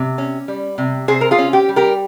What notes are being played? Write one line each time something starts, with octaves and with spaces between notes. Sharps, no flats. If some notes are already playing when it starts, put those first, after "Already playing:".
Already playing: C3
C#4
G3
C3
C3 G#4 C5
A#4
F4 G#4
C#4
G4
G3
G4 A#4